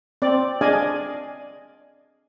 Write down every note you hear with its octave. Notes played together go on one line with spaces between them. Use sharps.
C4 D5
D4 G#4 D5 D#5 F5 G#5